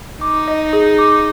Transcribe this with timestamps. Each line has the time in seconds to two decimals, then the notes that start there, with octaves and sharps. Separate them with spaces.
0.21 D#4 D6
0.48 D#5
0.73 G#4
0.99 D6